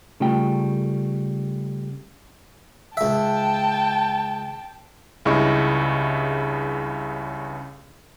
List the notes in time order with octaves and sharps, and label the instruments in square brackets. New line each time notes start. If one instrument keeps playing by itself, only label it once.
[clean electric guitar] C#3 G3 A3 F4 G5
[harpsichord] C#2 E5 [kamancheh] G5 A5
[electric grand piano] C#2 G2 C#3 E4 D#5 C#6